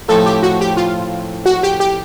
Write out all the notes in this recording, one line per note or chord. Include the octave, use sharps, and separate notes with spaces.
A2 F3 A3 C4 A4
G4
F#4
G4
F4
F#4
G4
G4